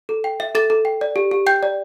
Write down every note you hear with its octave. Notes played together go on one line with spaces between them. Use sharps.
A4
G5
E5
A4 A6
A4
G5
D5
G4
G4
G5 G6
D5